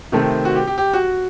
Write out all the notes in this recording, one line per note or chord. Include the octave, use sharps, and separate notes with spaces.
C3 D#3 A3 C4
F#4
G4
G4
G4
F#4